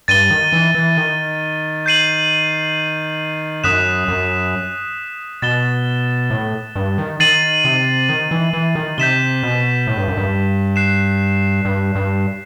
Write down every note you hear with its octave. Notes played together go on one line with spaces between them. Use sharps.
G2 A6 D#7 G7
D#3
E3
E3
D#3
G6 C7 D#7 F#7
F#2 D#6 F#6 B6 E7
F#2
B2 A6 E7 G7
A2
G2
D#3
D#3 A6 C7 D#7 F#7
C3
D#3
E3
E3
D#3
C3 G6 B6 E7 G7
B2
A2
G2
F#2
G2
F#6 C7 E7
G2
G2